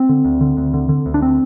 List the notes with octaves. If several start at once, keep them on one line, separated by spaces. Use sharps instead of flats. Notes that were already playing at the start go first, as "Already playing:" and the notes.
Already playing: C4
D3
D2
D3
D2
D3
D3
D2
D4
C4